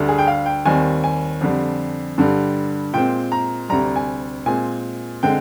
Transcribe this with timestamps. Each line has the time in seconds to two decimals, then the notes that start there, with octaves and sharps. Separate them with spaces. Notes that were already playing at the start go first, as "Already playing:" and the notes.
Already playing: D2 D3 G3
0.09 G#4
0.19 G5
0.27 F5
0.46 G5
0.65 D#2 D#3 G3 C4 G#5
1.04 G#5
1.41 F2 D3 G3
2.18 G2 D3 G3
2.93 A#2 G#3 C4 G5
3.32 A#5
3.69 D2 C3 G3 A#5
3.96 G#5
4.46 A#2 G#3 C4 G#5
5.23 D3 G#3 C4 G5